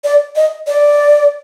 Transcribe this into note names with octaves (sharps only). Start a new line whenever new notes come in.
D5
D#5
D5